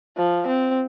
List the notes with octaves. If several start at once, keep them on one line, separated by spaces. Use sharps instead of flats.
F3
C4